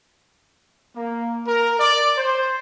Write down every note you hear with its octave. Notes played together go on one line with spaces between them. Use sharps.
A#3
A#4
D5
C5